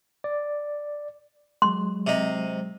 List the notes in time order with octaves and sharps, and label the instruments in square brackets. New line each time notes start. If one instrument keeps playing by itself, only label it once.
[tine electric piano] D5
[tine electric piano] F#3 G#3 [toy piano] C6
[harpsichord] C3 D#4